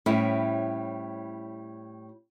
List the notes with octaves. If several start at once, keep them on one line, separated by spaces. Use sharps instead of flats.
A2 G3 C4 C#4 E4